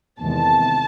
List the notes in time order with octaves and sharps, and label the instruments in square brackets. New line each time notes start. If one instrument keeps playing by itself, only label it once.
[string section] E2 C3 D#3 G#3 A5